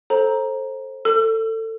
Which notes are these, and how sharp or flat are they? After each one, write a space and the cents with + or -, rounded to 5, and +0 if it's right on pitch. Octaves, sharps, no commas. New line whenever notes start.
A4 +0 C5 +20 A#5 +5
A4 +25 E6 +40